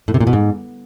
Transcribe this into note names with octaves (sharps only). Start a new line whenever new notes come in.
A2
C3
A#2
B2
G#2